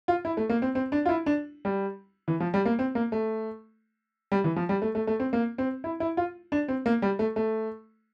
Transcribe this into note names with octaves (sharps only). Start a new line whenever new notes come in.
F4
E4
A3
A#3
C4
C4
D4
F4
E4
D4
G3
E3
F3
G3
A#3
C4
A#3
A3
G3
E3
F3
G3
A3
A3
A3
C4
A#3
C4
E4
E4
F4
D4
C4
A#3
G3
A3
A3